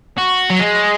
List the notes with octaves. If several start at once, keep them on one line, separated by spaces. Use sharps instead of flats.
F#4
F#3
G#3